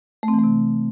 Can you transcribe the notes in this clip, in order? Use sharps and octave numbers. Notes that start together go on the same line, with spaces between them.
A3
C4
E3
A3
C3